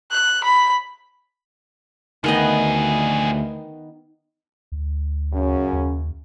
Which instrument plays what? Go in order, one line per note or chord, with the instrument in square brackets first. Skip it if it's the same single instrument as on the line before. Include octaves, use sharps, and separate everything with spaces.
[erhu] F#6
B5
[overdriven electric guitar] D2 [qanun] D#3 B3 D#5 [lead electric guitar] F3 G#4
[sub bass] D2
[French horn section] F#2 C#3 C#4
[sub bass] D#2